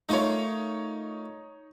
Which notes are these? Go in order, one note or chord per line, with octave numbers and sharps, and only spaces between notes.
A3 A#3 D#4 F4 C#5